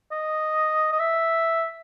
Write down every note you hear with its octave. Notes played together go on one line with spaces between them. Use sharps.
D#5
D#5
E5